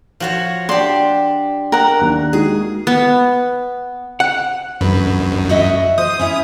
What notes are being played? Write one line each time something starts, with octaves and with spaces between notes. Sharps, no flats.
F3 F#4 C#5
D4 G4 C6
A#4 F#5 G5
D#2 D4 F#6
G#3 D#4 F#4 G#4
B3
F#5
F#2 B4
F#4 D#5 E5
C5 D#6
C#4 E4 E5